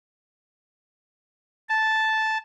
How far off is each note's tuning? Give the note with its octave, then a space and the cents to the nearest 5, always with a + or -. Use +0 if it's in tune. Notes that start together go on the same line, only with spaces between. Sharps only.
A5 -5